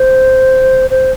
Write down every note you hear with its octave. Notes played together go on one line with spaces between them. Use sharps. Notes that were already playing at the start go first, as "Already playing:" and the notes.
Already playing: C5
C5